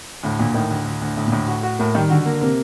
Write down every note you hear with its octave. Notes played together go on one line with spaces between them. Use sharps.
D2 A2
D2 A#2
A2 D#3
D2
D2
D2
D2 A2
A#2
D2 A2
F#4
F#4
A2 A#3
D#3 G3
D3 F#4
A#3
C3 A#3